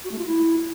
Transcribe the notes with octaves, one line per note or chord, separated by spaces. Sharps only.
F#4
A3
F4
E4